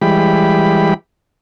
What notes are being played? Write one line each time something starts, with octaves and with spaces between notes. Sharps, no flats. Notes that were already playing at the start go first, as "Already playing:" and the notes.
E3 G3 G#3 G4 B5